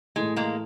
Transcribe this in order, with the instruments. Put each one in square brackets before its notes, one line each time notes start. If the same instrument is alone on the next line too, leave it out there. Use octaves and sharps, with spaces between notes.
[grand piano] A2 E3 A3 [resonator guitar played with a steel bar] G#3
[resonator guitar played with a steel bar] G#3 A#3